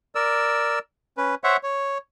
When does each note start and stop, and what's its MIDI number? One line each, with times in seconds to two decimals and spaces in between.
0.15 0.79 70
0.15 0.79 74
0.15 0.79 88
1.18 1.35 61
1.18 1.35 71
1.44 1.57 72
1.44 1.57 73
1.44 1.57 76
1.44 1.57 78
1.63 1.98 73